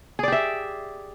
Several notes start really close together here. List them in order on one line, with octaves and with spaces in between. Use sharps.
G#4 D5 G4 E5